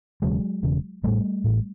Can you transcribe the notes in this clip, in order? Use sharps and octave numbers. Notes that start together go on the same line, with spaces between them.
E1 E2 C#3 F#3 G#3
E1 E2 C#3
A1 A2 G3 A3
A1 A2